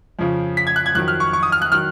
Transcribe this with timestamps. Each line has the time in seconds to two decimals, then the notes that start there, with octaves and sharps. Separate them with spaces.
0.19 F2 C#3 F3
0.57 B6
0.67 G#6
0.76 F#6
0.86 G#6
0.95 F2 D#3 F#3 F#6
1.08 F6
1.20 C#6
1.33 C#6
1.43 D#6
1.52 F6
1.62 F#6
1.72 D#3 F#3 F6